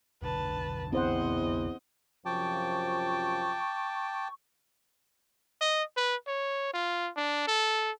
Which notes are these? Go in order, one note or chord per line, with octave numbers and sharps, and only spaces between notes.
F1 B1 D3 B4 A5
E2 C4 C5 D#5 F#5
F#2 C3 F3 G5 A5 C#6 D6
D#5
B4
C#5
F4
D4
A4